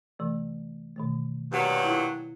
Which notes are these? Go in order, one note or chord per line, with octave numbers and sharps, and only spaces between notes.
C3 E3 A3
B2 D#3 A3
G2 A#2 F#3
E4 F4